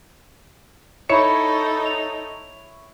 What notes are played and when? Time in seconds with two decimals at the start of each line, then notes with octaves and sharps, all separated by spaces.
1.09 D#4 E4 A4 C#5 B5 C#7 E7
1.85 F7